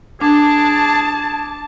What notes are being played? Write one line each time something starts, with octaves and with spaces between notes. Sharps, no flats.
D4 G#4 A5 D6